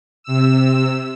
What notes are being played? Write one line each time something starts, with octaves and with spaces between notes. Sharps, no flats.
C3 E6